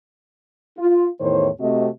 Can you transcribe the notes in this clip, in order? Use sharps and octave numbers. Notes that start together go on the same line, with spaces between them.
F4
E2 A2 D#3 C5 C#5
C3 A3 C4 F#4 D#5